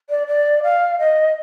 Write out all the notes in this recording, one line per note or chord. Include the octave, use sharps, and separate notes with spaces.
D5
D5
F5
D#5